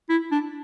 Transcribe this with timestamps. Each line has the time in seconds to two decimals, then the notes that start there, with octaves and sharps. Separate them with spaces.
0.09 E4
0.31 D4